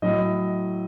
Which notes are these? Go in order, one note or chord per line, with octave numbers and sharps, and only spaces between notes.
A2 F#3 D#5